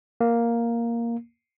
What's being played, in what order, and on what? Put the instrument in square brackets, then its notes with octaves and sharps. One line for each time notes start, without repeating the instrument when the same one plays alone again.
[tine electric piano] A#3